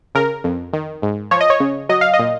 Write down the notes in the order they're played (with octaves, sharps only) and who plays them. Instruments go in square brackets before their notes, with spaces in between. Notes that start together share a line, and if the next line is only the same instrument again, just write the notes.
[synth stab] C#3 A#4
F2
D#3
G#2
F3 C#5
D#5
C#5
C#3
F#3 D#5
F5
D#5
A#2